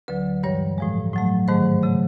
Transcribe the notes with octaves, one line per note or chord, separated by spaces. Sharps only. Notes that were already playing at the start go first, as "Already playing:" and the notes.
D2 D3 F#3 B4
G2 E3 G3 C#5
A2 F3 G#3
A2 F#3 A3
G#2 D#3 F#3 A3 C5
C#3 F#3 A3